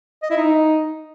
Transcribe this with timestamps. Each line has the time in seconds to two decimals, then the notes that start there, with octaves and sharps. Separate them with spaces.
0.23 D#5
0.30 E4
0.37 D#4